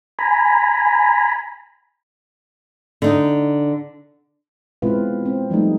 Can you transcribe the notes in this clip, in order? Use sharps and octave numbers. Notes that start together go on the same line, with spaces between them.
G#5 A#5 B5
D3 D#4
B2 G#3 C4 E4 F4 B4
C4
F3 G3 A3 D#4